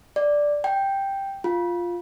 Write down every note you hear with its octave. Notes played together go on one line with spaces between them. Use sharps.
D5
G5
F4